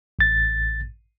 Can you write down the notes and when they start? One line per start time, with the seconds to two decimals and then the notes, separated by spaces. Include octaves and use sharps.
0.19 A1 A6